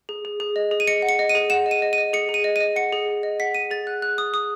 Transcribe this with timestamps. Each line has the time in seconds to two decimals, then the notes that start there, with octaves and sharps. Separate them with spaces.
0.09 G#4
0.25 G#4
0.40 G#4
0.56 D#5
0.71 G#4
0.80 D#7
0.87 D#5 C#7
1.02 F#5
1.09 C#7
1.19 D#5
1.29 D#7
1.35 G#4
1.50 F#5 E7
1.66 D#5
1.71 D#7
1.82 D#5
1.93 D#7
1.98 D#5
2.13 G#4 C#7
2.29 G#4
2.34 D#7
2.44 D#5
2.56 D#5 D#7
2.76 F#5 C#7
2.92 G#4
3.08 G#4
3.23 D#5
3.40 F#5 B6
3.55 G#4 D#7
3.71 G#4 A6
3.87 F#5 F#6
4.02 G#4 F#6
4.18 G#4 D#6
4.34 G#4 D#6